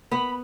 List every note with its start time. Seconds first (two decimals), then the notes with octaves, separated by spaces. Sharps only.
0.11 B3 B5